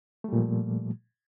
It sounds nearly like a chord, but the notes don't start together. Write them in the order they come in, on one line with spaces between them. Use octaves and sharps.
A3 G3 A#2 F3